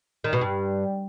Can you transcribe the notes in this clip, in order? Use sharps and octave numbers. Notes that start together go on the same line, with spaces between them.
D#3
B2
G2